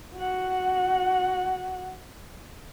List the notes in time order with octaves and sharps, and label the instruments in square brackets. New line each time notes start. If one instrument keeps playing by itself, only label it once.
[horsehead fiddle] F#4 F#5